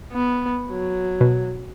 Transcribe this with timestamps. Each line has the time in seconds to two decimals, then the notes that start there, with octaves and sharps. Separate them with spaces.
0.12 B3
0.71 F#3
1.21 B2